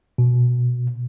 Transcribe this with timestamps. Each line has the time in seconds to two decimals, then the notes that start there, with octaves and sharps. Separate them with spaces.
0.18 B2